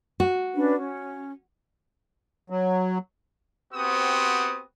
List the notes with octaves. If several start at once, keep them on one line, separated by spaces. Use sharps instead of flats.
F#4
C#4 D4 B4
C#4
F#3
B3 C4 F#4 G4 C5 D#6